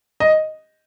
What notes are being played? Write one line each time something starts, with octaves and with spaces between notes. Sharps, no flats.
D#5